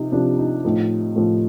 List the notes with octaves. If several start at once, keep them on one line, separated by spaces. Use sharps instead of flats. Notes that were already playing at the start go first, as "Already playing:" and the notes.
Already playing: C3 F3 D#4 G4
C3 F3 D4
D#4
A2 F3 D#4
A2 F3